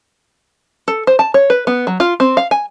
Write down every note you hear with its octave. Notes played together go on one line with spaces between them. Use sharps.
A4
C5
A5
C#5
B4
B3
F#3
F4
C4
F5
G#5